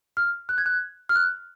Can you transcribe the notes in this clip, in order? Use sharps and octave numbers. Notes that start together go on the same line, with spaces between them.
F6
F#6
G#6
F#6
F6
F#6